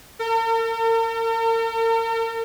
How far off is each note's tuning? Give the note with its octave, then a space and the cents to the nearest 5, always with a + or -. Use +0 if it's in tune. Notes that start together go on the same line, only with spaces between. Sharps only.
A#4 -45